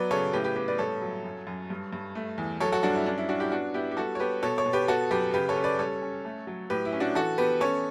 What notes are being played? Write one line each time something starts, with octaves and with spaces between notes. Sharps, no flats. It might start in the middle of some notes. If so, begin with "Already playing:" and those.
Already playing: F#3 B3 B4 D5
C#3 A4 C#5
A2 G4 B4
G4 B4
B3 G4 B4
B4 D5
G2 A4 C#5
F#3
F#2
F#2
G2
G2
A3
E2
F#3 A4 C#5
F#4 A4
G2 D4 F#4
E4
C#4 D4
E4
C#4 D4 F#4
E4 G4
B3 D4 F#4
B3 E4 G4
G4
G3 F#4 A4
C#5
B3 G4 B4
B2 A4 C#5
A4 C#5
B2
G4 B4
B3 F#4 A4
F#2 G4 B4
C#3 G4 B4
A4 C#5
C#4
B4 D5
G3 A4 C#5
C#4
A3
F#3
A2 G4 B4
E4
C#4
D4 F#4
E3 F#4 A4
B3 G4 B4
C#4 A4 C#5